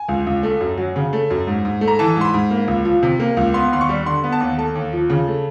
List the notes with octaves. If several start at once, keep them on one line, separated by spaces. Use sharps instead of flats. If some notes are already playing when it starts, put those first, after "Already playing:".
Already playing: G#5
C#2
C#2
A3
F#2
F#3
C#3
A3
F#2
G#2
G#2
A3
A#5
E3 A5
G#2
C6
B5
G#2
A#3
C#2
F3
C3
A#3
C#2
B3 C6
D#2 C6
C#6
G3
D3 C6
B3
A5
D#2
A3 A5
D#2
F3
C#3
A3